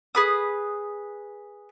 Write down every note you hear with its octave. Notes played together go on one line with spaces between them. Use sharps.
G#4 B4 D#6